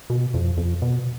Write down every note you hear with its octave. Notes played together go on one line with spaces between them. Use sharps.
B2
F2
F2
B2